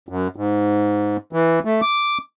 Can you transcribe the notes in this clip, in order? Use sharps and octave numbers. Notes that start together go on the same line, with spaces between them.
F#2
G#2
E3
A3
D6